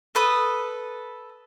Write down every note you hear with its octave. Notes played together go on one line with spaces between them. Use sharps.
A4 B4 D#6